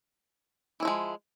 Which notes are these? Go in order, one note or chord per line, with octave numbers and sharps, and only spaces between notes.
E3 F3 G#3 E4